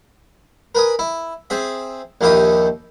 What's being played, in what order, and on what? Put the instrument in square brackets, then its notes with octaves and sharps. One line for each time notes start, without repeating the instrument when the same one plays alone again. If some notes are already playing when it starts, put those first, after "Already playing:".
[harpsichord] A#4 B4 G#5 D#6
E4
C4 G#4 E5
A#1 D#2 D#3 E4 G4 D#6